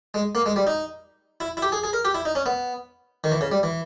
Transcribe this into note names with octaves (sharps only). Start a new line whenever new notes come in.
G#3
A#3
G#3
G3
D#4
E4
E4
G4
G#4
G#4
A#4
G4
E4
D#4
C#4
B3
D#3
E3
C#3
G3
E3